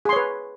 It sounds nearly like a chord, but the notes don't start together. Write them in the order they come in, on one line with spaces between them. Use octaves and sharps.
G#4 C6 C#5 B4